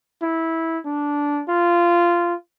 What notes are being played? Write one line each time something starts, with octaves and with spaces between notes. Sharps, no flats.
E4
D4
F4